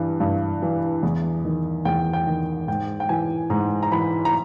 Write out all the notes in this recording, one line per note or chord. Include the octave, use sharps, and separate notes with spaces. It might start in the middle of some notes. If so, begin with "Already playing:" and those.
Already playing: G2 E3
G2
E3
E2
D#3
E2 G5
G5
D#3
G#2 G5
G5
E3 G#5
G#2 A#5
A#5
E3 B5
A#5